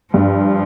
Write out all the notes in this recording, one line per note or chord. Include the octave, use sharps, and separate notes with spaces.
G2 F3